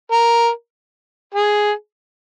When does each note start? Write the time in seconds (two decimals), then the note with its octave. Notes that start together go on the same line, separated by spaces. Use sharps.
0.12 A#4
1.35 G#4